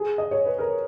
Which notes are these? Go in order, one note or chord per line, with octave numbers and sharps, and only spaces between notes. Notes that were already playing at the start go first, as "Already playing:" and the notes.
Already playing: G#4
D#5
C#5
B4
A#4